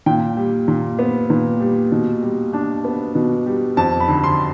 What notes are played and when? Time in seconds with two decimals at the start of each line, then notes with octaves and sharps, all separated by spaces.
0.06 A#2 G5
0.37 G3
0.68 A#2
0.99 B3
1.30 A#2
1.60 G3
1.92 B2
2.23 G3
2.53 D4
2.84 B3
3.15 B2
3.46 G3
3.77 F2 A5
4.00 B5
4.08 D3
4.24 C6